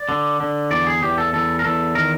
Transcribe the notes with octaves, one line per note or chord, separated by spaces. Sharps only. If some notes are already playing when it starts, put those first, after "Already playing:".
Already playing: D5
D3
D3
E2 D5
G#4
E2 G4
A4
E2 A4
A#4
E2 A4
D#3 A#4